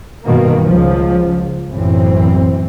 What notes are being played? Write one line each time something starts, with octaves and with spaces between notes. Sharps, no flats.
G2 B2 D#3 A#3
C#2 F3
F#1 B1 F#2 A2 E3 C4